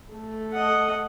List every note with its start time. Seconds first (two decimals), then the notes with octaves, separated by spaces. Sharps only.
0.13 A3 A4
0.53 D#5 F#5